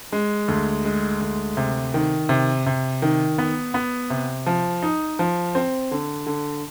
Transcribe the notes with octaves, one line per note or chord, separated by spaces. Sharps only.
G#3
D2
G#3
D2
C3
D#3
C3
C3
D#3
B3
B3
C3
F3
D#4
F3
C4
D3
D3